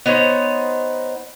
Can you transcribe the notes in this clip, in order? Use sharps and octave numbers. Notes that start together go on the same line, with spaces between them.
B3 D#4 C5 C#5